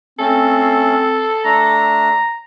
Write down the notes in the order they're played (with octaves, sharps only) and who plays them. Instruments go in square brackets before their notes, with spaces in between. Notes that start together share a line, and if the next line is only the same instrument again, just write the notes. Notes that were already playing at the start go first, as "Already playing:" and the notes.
[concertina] A3 C#4 [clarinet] C4 [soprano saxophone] A4
[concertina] A3 D4 [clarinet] A#5